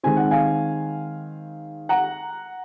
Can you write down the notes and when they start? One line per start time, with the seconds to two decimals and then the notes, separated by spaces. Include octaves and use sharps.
0.03 D#3 G#3 C4 G#5
0.17 F#5
0.31 F5 G#5
1.89 F#5 A#5